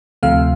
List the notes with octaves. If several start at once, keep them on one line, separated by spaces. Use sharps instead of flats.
D2 C3 F3 A3 F5